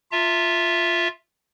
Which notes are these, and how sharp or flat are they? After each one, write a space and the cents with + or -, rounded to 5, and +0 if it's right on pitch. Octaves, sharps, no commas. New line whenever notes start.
F4 +0 E5 +0 A#5 -45